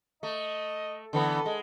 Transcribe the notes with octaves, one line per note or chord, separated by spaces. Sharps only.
A3 D#5
D3 E3 B3 A4
G#3